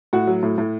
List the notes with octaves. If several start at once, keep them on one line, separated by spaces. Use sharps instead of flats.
A2 F#4
F#3
A2
A2